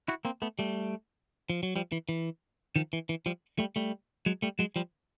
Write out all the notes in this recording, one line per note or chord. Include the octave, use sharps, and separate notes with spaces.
E4 F#4
A#3 C4
A3 B3
G3 A3
F3
F#3
F3 G3
E3
E3
D#3 F3
E3
E3
F3 G3
G3 A3
G3 A3
F#3 G#3
G3 A3
F#3 G#3
F3 G3